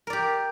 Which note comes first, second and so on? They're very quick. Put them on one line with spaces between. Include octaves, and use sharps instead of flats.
A#4 D5 G4